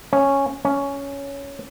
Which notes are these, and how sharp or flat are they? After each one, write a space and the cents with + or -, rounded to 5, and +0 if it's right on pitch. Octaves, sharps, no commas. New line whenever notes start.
C#4 -5
C#4 +10